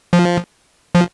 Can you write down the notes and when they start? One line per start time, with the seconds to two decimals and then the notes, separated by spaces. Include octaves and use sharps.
0.13 F3
0.95 F3